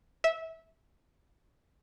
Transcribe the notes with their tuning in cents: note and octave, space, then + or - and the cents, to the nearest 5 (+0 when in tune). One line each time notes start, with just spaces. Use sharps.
E5 -20